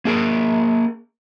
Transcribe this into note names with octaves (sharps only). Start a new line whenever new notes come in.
A#3 G#4 A#4